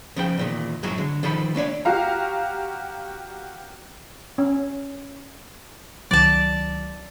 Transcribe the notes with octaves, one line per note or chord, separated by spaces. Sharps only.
C#3 F3 G5
E2 A#2 D#3
F#2 A2 F#3 G#3
D3
D#3 F3 A4 B5
A3 A#3 D4 C#5
F#4 G4 F5 A#5
C#4
C#2 D#3 F#3 D5 A5